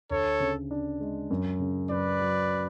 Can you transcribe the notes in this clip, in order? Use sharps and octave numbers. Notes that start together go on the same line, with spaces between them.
D2 A4 C#5
C#3
D4
G#3
F#2
C#3
F#2 B4 D5
F#3